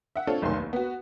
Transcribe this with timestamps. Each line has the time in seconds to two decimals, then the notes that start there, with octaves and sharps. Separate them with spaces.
0.16 E5 F#5
0.27 C4 D4 F4 A4 C#5
0.42 F1 B1 D#3 A3 C6
0.56 D#2
0.73 B3 F#4